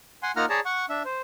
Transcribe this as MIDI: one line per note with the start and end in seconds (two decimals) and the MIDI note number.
0.23 0.32 78
0.23 0.32 80
0.23 0.32 84
0.36 0.46 58
0.36 0.46 63
0.36 0.46 65
0.36 0.46 78
0.36 0.46 82
0.36 0.46 89
0.49 0.60 68
0.49 0.60 73
0.49 0.60 74
0.49 0.60 81
0.49 0.60 82
0.65 0.86 78
0.65 0.86 85
0.90 1.03 62
0.90 1.03 76
1.05 1.22 72